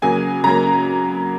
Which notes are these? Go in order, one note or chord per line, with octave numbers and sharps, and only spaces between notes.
C#3 F#3 A#3 G#5
C#3 F#3 A#3 A#5